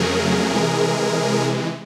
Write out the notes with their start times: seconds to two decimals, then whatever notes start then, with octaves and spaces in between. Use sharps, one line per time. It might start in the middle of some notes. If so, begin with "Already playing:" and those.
Already playing: F2 C#3 F#3 A3 G#4 A#4
0.51 C3 E3 G#3